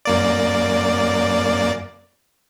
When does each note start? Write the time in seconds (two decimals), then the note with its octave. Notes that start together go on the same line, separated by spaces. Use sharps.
0.05 F#2 A#3 D5